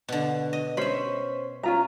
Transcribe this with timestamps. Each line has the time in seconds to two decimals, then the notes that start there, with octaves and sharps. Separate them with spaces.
0.08 B2 D3
0.53 D#5
0.77 C#4 C5 C#5 E5 B5
1.63 C#4 F4 A#5